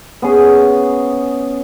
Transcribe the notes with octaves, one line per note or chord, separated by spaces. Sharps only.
B3 C#4 G#4